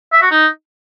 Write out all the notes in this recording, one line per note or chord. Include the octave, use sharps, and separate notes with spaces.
E5
F#4
D#4